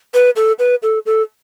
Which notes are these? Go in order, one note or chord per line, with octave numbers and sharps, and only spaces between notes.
B4
A4
B4
A4
A4